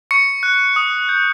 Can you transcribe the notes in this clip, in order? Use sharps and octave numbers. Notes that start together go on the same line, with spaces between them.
C#6 C#7
F#6
D#6
G6